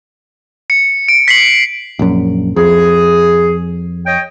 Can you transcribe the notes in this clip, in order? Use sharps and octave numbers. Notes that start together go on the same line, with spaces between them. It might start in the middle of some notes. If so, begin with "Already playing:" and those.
C#7
D7
B6 C7 F#7
A#1 F#2
F2 G#4
C#5 D#5 G5